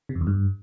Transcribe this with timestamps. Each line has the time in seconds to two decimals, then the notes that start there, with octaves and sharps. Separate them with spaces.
0.09 C3
0.15 F2
0.21 E2
0.27 G2